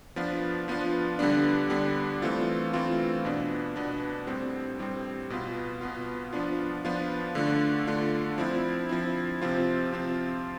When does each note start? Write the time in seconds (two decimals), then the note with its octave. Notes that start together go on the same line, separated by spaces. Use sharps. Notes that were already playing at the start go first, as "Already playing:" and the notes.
0.16 F3 B3 D4 F4
0.68 F3 B3 D4 F4
1.19 D3 G3 B3 D4
1.70 D3 G3 B3 D4
2.22 E3 A3 C4 F4
2.73 E3 A3 C4 F4
3.25 B2 B3 D4
3.76 B2 B3 D4
4.27 A2 G3 C4
4.79 A2 G3 C4
5.30 B2 B3 F4
5.81 B2 B3 F4
6.33 F3 B3 D4 F4
6.85 F3 B3 D4 F4
7.35 D3 A3 D4 F4
7.87 D3 A3 D4 F4
8.38 F3 C4 E4
8.89 F3 C4 E4
9.42 C3 F3 C4 F4
9.92 C3 F3 C4 F4